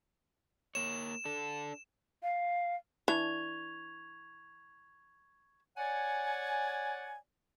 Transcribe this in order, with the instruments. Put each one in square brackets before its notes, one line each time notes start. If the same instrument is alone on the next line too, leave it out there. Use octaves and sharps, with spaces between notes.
[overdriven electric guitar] A#3 C#5 [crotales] E7
[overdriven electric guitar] D4 A4
[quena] F5
[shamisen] E3 D4 [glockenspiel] C#6 G#6 F7
[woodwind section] C#5 D5 F#5 G#5